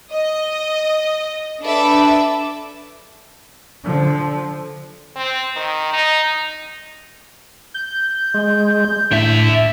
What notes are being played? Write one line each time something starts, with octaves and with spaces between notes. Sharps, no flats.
D#5
D4 A4 B4 E5 D6
D3 F3
C4
D#3
D#4
G6
G#3
A2 D3 E5